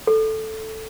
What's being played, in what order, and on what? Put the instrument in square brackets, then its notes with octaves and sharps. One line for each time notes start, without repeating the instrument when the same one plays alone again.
[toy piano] A4